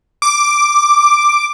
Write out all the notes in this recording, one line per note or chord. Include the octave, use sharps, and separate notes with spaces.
D6